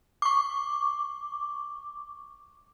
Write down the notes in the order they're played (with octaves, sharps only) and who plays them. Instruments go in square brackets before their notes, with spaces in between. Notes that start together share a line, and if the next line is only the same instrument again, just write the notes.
[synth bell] C#6 D6